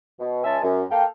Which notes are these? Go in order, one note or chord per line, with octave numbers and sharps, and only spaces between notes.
B2
C#2 G#3 C#4 E5 G#5 A5
F#2
A#3 A4 F5 G5